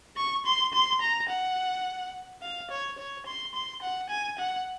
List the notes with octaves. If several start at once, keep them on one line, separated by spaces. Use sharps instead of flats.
C#6
C6
C6
A#5
F#5
F5
C#5
C#5
C6
C6
F#5
G#5
F#5